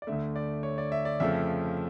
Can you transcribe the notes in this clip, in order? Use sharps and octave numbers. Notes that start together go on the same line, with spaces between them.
D5
D2 D3 A3 E5
D5
C#5
D5
E5
D5
F2 C#3 F3 A3 E5